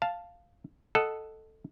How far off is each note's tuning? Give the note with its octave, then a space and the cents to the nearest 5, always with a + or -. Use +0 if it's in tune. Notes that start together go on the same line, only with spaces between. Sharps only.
F5 +0 A5 +0
A4 +0 D#5 +0 F#5 +0